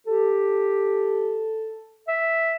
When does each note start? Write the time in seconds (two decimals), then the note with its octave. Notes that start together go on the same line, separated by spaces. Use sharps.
0.07 G4 A4
2.08 E5